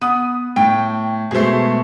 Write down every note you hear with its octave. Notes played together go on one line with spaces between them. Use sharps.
B3 D#6
A2 G5
B2 G#3 A3 G#4 C5